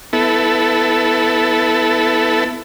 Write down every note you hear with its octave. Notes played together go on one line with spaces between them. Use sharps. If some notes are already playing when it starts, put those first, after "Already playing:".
B3 E4 A4